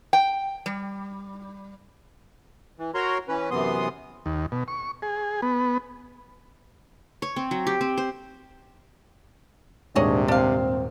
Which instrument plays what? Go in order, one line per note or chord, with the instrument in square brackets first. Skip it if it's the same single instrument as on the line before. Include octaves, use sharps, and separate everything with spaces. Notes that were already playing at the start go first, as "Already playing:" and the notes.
[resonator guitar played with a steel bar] G5
G3
[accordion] E3
F#4 A#4 C#5 A#5 C6
E3 C#4 B4
F#2 C3 E3 B3 C6 D#6
[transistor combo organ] D#2
B2
C#6
G#4
B3
[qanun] C#5
C4
F#3
G4
C4
C5
[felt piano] D#1 G#2 [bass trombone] C3 [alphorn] D4 [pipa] G#4 C#5 D#5
[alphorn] C4 [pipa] D4 F5